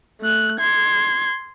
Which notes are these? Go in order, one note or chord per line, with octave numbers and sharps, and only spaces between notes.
A3 F#6
C6 G#6